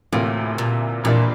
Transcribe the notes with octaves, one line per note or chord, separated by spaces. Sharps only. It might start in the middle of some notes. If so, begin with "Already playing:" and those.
D2 A2 C3 E3 A#3 F4
A#2
F2 A#2 E3 G3 A#3 D4